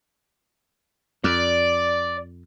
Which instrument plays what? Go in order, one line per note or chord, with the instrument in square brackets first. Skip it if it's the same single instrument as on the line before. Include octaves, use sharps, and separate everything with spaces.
[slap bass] F2 [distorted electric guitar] D5